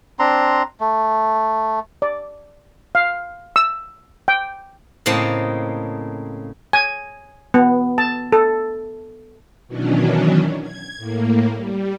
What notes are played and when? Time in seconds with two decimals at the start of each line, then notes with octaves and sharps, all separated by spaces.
0.19 C4 D4 A#5 C6
0.80 A3
2.02 D5
2.95 F5
3.56 E6
4.28 G5
5.06 A2 C#3 A#3 C4 D#5 A5
6.73 G#5
7.54 B3
7.98 A5
8.32 A4
9.68 B2 D#3 E3 F#3 C#4 D4
10.62 G#6
10.97 A2 A#3
11.53 G3